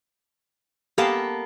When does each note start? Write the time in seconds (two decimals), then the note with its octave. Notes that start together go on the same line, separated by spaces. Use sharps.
0.98 A#3 B3 G4 A4 F5 A5